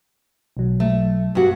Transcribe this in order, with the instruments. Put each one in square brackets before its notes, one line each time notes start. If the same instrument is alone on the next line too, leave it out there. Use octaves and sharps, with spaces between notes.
[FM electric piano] B1 F#3
[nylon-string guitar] A3
G2 F#4